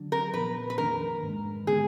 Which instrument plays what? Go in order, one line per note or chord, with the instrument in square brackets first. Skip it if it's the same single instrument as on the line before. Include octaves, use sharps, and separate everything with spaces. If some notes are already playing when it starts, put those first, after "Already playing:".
Already playing: [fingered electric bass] D3 F#3 D4
[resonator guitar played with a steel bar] A#4
[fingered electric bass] A#2 F3 B3 [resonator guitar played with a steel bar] B4
[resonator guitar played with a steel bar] B4
[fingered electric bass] F2 D#3 A#3 D4 [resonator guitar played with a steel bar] A#4
[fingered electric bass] G#2 D#3 G#3
[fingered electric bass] D3 G#3 B3 D4 [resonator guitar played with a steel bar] G#4